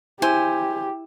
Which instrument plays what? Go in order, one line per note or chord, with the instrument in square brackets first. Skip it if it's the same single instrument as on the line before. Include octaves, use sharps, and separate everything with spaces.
[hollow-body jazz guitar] E4 [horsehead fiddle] G4 [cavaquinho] C5 G#5